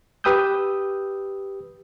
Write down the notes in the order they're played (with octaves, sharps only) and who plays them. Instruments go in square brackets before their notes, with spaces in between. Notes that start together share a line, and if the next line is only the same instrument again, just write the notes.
[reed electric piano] G4 B4 G5 D#6 E6 G6